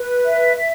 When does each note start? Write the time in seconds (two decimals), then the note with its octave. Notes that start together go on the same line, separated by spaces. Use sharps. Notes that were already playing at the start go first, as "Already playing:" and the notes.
Already playing: B4
0.25 E5
0.55 E5